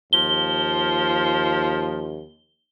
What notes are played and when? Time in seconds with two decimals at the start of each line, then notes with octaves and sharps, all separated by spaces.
0.13 D#2 F3 G7